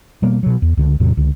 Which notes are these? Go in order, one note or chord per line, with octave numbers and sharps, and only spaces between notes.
B2 G3 A#3 B3
B2 F#3
E2
C#2 D3
E2 A2 C3 F#3
C#2 D3